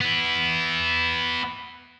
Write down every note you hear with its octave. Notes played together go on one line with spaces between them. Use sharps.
B3 E4